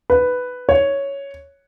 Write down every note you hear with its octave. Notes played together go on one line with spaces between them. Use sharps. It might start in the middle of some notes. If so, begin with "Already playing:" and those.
B4
C#5